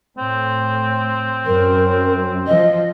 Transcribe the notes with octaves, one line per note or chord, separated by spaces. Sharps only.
A2 C4
F#2 A#4
F3 D#5